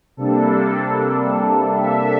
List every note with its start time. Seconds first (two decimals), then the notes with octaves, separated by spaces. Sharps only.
0.17 C3 G3 A#3 D4 A4
1.73 E5